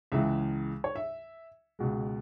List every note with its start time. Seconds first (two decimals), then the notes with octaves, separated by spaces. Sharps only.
0.12 C#2 C#3 E3 G#3 E5
0.84 C#5
0.96 E5
1.79 C#2 B2 G#3